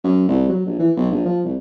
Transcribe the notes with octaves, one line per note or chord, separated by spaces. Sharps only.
F#2
C2
F#3
A#1
E3
B1
A#1
F3
C2